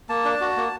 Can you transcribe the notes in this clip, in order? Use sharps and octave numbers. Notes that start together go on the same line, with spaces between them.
A#3 A5
D4
F#4
A#3